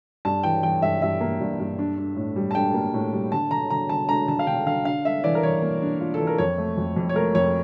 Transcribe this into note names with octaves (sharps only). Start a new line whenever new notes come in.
G2 A5
E3 G5
E3 G5
G2 E5
G2 E5
A#3
G2
G2
D4
D4
A2
G3
A5
D4 G5
A#3
A2
G3
D3 A5
D3 A#5
D3 A#5
D3 A5
D4 A#5
D3 A5
F5
D3 G5
D3 F5
D4 F5
D4 E5
E3 D5
A#4
E3 C#5
A#3
D4
F4
A4
E3
A#4
F2 C#5
A3
F2
F2
C#5
A3 A#4
F2 C#5